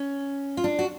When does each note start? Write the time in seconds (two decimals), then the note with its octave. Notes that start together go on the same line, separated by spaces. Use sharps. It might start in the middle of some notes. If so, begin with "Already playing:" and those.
Already playing: C#4
0.57 F4
0.64 D4
0.79 F#4